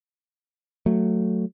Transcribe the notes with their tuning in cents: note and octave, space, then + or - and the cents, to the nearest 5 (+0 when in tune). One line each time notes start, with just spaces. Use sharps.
F#3 +0 A3 +5